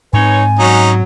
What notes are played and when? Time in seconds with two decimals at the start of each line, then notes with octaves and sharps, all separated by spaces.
0.13 G#2 C4 D#4 B4 C#5 G#5
0.59 F#3 C#4 D#4